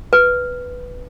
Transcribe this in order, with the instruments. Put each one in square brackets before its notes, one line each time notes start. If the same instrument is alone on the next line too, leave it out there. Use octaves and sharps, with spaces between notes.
[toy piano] B4